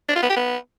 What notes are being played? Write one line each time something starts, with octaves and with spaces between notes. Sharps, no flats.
D4
F4
B3
G4
B3